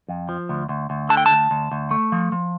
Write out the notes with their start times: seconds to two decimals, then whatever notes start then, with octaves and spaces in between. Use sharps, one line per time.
0.08 F2
0.29 F3
0.49 D2
0.69 D2
0.90 D2
1.09 D3 A5
1.17 G5
1.26 A5
1.31 D2
1.51 D2
1.72 D2
1.91 A3
2.12 F3
2.32 F3